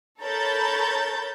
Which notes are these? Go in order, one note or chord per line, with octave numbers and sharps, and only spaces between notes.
A4 A#4 C#5 B5 G6 A6